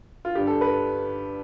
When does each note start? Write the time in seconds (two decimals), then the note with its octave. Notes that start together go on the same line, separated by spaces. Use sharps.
0.25 F4
0.33 G2 D3 G4
0.47 A4
0.61 B4